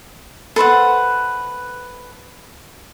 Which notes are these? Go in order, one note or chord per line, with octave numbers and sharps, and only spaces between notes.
A4 B4 C5 F#5